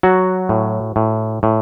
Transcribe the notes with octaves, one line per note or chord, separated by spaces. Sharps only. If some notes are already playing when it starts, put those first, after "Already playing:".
F#3 F#4
A2
A2
A2